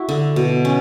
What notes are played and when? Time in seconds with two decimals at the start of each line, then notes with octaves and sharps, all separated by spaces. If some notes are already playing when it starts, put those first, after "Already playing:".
Already playing: E4 F#4
0.09 D3
0.36 B2
0.65 C#4